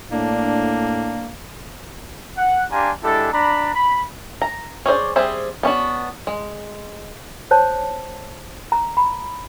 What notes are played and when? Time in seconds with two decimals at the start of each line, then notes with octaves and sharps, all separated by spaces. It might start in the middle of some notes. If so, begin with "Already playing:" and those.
0.11 A2 A#3 D4
2.38 F#5
2.71 D4 G4 F5 G#5 A#5 C6
3.04 G#3 D4 E4 G4 A4
3.33 D4 A#5 B5
3.75 B5
4.42 A#5
4.86 C#4 G#4 C5 D5
5.16 G3 C4 G#4 C5 E5
5.63 B3 C#4 D4 F#4
6.27 G#3
7.51 C5 C#5 A5
8.72 A#5
8.97 B5